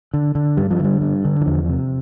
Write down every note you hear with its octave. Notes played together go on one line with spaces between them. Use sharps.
D3
D3
G2 G3
F3
D3 G3
G2
D3
E3
E2 F3
C3